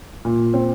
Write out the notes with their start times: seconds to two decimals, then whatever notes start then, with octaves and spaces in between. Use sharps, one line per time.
0.25 A#2
0.54 C4